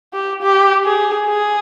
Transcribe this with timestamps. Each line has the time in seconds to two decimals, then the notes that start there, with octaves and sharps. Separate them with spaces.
0.13 G4
0.43 G4
0.85 G#4
1.26 G#4